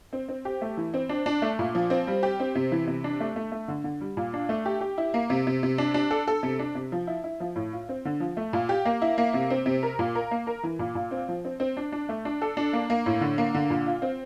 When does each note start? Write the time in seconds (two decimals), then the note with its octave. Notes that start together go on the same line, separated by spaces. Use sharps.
0.13 C4
0.29 C4
0.45 G4
0.62 A3
0.77 E3
0.94 C4
1.09 D4
1.26 D4
1.42 A3
1.59 A#2
1.75 F3
1.90 C4
2.07 G3
2.23 G4
2.40 C4
2.55 C3
2.72 E3
2.87 C3
3.04 D4
3.20 A3
3.36 A3
3.52 A3
3.68 D3
3.84 D3
4.01 G3
4.17 A#2
4.34 D4
4.49 A3
4.65 G4
4.81 G4
4.98 E4
5.14 A#3
5.30 C3
5.47 C3
5.63 C3
5.78 D4
5.94 D4
6.11 A4
6.28 A4
6.43 C3
6.59 D4
6.75 C3
6.92 F3
7.07 E4
7.24 E4
7.40 F3
7.56 A2
7.73 F4
7.89 C4
8.05 D3
8.20 F3
8.37 A3
8.53 A#2
8.69 G4
8.85 A#3
9.02 E4
9.18 A#3
9.34 C3
9.50 C4
9.66 C3
9.83 A#4
9.99 A#2
10.15 A#4
10.31 A#3
10.47 A#4
10.63 E3
10.79 A#2
10.95 A#2
11.11 C4
11.28 F3
11.45 C4
11.60 C4
11.77 D4
11.92 D4
12.09 A3
12.25 D4
12.42 A4
12.57 D4
12.73 A#3
12.90 A#3
13.06 A2
13.21 D3
13.38 A#3
13.54 D3
13.70 A#2
13.86 F4
14.02 C4